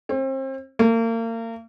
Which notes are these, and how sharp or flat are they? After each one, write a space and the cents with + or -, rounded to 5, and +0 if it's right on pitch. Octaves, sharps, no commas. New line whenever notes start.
C4 +35
A#3 -35